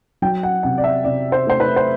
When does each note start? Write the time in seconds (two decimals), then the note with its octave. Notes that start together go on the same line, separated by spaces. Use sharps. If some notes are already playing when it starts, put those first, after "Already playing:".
0.22 F#3 G5
0.43 F#5
0.63 C3 F#5
0.78 D5
0.84 E5
1.04 C3 D5
1.32 C5
1.47 A3 C5
1.60 B4
1.76 C5